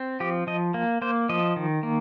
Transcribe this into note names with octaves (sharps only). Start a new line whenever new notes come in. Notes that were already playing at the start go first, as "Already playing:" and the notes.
Already playing: C4
F3 G4
F3 D#5
A#3
A#3 C5
F3 D#5
D#3
A#3